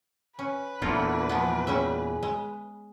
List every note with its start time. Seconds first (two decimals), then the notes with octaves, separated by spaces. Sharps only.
0.39 C#4 B4
0.82 E2 A#2 D3 E4 F4
1.29 F3 G#3 B3
1.67 G3 C#4 G#4 E5
2.23 G#3